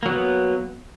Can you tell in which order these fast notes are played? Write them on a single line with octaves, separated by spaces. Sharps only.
A#3 F#3 B3